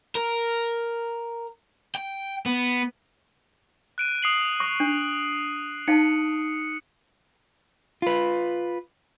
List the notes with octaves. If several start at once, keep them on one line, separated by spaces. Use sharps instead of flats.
A#4
G5
B3
F#6 D7 D#7
D#6 C7 F#7
C#6
D4
D#4 F5 A5 C#7
F4 B4